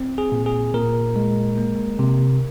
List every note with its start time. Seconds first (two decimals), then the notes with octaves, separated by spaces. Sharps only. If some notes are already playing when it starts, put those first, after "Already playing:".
Already playing: C4
0.18 G#4
0.32 A#2
0.46 G#4
0.74 A#2 A#4
1.16 G#3
1.58 A#3
1.99 C3